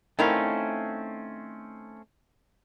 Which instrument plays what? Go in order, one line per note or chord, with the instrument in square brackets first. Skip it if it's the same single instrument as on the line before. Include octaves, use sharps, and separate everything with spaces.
[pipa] D#3 E4 F5 [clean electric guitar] A3 C4 C#4